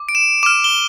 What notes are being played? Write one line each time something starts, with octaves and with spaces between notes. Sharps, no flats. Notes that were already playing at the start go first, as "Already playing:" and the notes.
Already playing: D6
D7
E7
D6 F6 E7
G7